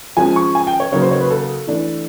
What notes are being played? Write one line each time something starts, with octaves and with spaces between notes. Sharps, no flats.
F3 G#3 C#4 G#5
C#6
G#5
G5
C#5
C#3 F#3 A#3 D#4 C#5
C5
C#5
B4
A4
E3 A3 D4